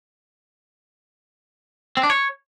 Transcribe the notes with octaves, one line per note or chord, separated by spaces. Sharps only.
C4
D4
C#5